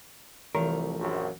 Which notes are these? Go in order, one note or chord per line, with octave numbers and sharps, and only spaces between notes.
C2 E3 F3 A3 A#4
A#1 F#2